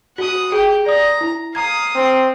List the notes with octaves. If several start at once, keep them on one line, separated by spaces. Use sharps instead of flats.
F#4 F#5 D#6
G4 G#4 G5
D5 A#5 D#6
E4
F5 A#5 D#6 G#6
C4